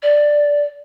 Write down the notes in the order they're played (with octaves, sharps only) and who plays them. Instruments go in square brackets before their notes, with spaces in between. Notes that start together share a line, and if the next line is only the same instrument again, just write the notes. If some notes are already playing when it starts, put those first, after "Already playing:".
[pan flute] D5